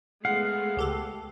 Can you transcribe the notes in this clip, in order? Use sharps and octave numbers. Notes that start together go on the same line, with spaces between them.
G#3 A3 B3 F5 F#5
C#2 G4 A4